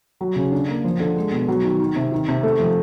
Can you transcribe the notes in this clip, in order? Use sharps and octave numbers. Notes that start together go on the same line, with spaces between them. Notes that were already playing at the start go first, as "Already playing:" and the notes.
F#3
C#3
D4
A#3
F3
D3
G#3
B2
F#3
D#3
D#3
C3
D#3
C3
A3
F3